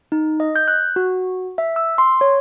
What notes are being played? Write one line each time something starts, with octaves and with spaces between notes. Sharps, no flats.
D#4
D#5
G6
F#6
F#4
E5
E6
C6
C#5